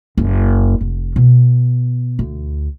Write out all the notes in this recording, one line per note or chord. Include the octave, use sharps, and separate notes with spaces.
F#1
F1
B2
D2